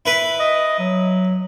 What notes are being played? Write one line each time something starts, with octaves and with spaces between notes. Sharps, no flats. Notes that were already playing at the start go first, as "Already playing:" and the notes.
E4 B4 B5
D#5
F#3